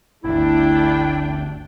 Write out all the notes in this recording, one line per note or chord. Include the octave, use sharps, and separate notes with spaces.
G1 D2 A3 D4 E4 G5